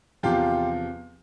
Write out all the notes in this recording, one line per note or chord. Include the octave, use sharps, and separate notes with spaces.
E2 C3 F3 F4 G4